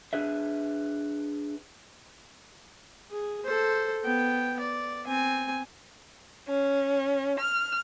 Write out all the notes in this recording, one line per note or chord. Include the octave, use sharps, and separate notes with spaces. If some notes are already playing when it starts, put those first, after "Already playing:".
D4 G#4 B4 E5
G#4
A4 C5
B3 G5
D5
C4 G#5
C#4
F6